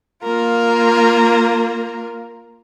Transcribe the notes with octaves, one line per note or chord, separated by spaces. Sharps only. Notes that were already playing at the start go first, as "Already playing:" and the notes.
A#3 F4 A#4